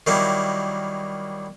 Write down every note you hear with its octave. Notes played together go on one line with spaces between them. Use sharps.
D#3 F#3 G3 A#3 E4